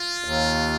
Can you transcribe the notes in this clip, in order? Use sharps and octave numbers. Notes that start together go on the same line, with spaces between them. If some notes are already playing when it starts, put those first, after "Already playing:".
Already playing: F4
D#2